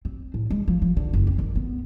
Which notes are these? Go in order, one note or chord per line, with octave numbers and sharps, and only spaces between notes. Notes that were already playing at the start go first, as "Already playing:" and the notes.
C4
A2
G#3
F3
F3
D3
F#1
C4
D#3
B3